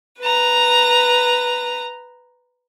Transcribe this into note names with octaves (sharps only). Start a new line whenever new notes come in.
B4 A#5